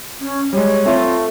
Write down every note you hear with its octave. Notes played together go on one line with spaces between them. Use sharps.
C#4
G3 G#3 C#5
A3 C4 F4